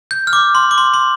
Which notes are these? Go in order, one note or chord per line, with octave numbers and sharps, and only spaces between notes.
G6
F6
D6
C6
D6
C6
C6